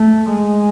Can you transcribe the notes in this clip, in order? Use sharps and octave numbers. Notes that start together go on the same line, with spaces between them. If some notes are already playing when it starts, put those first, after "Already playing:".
Already playing: A3
G#3